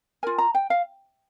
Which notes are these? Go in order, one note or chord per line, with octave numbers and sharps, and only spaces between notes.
F4 A#4 G#5
A#5
G5
F5